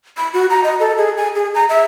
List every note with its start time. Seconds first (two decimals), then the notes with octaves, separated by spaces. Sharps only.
0.17 B5
0.34 F#4
0.50 A#5
0.64 D#5
0.80 A4
0.98 G#4
1.17 G#5
1.35 G#4
1.55 A#5
1.69 E5